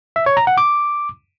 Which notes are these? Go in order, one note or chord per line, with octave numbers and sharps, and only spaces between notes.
E5
C#5
A#5
F#5
D6